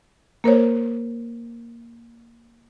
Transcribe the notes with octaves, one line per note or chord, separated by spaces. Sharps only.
A#3 A#4 C5 C#5